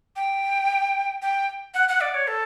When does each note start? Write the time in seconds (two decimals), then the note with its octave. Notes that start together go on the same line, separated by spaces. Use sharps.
0.16 G5
1.22 G5
1.74 F#5
1.89 F#5
2.01 D5
2.14 C#5
2.27 A4